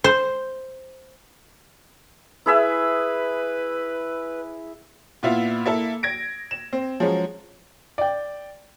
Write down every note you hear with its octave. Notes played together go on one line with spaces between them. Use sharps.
C5
E4 G#4 B4 E5
A#2 B3 E4 F4
A#3 E4 A4
G#6 A#6 D7
E7
C4
F3 F#3 G#3 C#4
D5 G5